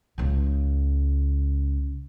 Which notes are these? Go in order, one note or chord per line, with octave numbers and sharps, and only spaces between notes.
C#2 C#3